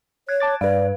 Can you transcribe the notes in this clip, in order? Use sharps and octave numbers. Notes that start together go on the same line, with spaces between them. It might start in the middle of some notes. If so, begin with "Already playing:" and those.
C#5 F#6 G#6
A5 D6 A6
G2 B4 D5 F5